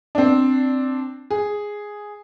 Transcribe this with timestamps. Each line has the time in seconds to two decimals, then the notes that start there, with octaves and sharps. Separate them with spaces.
0.15 C4 D4
1.30 G#4